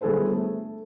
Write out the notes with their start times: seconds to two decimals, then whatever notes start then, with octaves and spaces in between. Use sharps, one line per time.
0.01 G1 B3 G#4 A4 B4 C5
0.33 A3